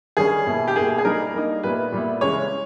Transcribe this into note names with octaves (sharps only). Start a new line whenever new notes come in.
D#3 G3 C#4 G#4
B2 A#3 E4
G4
B2 A#3 E4 G#4
G#4
G3 A#3 D#4 A#4
G3 A#3 D#4
A#2 G3 B3 E4 B4
A#2 G3 B3 E4
C#3 E3 G#3 C#4 C#5